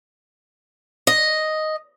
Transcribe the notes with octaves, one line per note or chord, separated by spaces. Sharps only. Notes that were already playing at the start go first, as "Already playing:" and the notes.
D#5